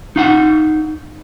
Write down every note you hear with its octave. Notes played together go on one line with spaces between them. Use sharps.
D#4 F5 F#5